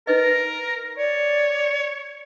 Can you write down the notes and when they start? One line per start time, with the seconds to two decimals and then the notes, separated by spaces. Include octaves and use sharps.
0.07 D#4 A#4 B4 D#5
0.98 C#5 D5